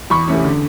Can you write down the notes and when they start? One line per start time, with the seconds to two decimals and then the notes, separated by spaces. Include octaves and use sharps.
0.10 E2 B5 C#6
0.28 C3 E3 A3 C#4
0.45 D3